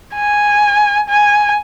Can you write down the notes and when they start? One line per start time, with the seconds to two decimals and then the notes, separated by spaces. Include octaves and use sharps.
0.15 G#5
1.09 G#5